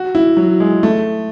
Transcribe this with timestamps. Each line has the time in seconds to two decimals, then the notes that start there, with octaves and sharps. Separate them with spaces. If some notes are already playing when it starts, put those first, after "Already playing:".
Already playing: F#4
0.15 E4
0.37 F#3
0.60 G#3
0.83 A3